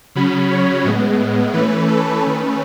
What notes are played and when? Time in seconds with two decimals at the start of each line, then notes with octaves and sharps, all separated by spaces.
0.15 C#3 F#3 C#4 B5
0.51 C#5
0.84 A2 G#3 B3
1.53 E3 A3 C#4 B4
1.88 A4
2.22 D#3 A3 C#4 B4